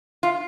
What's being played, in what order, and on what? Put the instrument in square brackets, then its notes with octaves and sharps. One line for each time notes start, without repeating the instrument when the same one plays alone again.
[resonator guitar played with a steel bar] F4